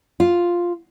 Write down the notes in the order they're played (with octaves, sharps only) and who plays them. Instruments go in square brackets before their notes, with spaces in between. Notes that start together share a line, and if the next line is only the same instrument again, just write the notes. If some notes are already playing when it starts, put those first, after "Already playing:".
[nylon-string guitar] F4